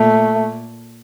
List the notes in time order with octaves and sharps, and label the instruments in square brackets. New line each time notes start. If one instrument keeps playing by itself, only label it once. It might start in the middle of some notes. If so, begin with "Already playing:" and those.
Already playing: [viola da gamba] A#2 [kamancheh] A3